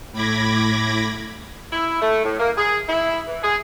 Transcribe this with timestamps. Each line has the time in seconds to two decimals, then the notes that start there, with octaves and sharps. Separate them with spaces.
0.12 A2 B5 D6 G#6 A#6
1.72 E4
2.01 A3
2.24 A2
2.39 A#3
2.57 G#4
2.88 E4
3.27 E3
3.43 G#4